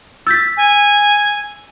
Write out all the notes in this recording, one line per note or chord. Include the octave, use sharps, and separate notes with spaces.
E6 G6 A6 B6
G#5